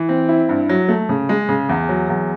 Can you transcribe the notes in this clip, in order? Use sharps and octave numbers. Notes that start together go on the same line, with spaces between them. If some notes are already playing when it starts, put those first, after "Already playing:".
Already playing: E3
C4
E4
G2
F#3
A3
C#3
G#3
C#3
E2
F#3
E2